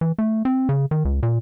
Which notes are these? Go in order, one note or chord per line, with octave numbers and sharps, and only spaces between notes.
E3
A3
C4
C#3
D#3
C#2
A#2